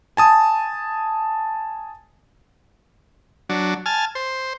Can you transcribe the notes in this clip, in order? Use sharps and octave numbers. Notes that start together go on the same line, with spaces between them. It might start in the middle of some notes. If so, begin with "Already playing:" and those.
G#5 A5 D#6
F#3 D4
G#5 A5 F6
C5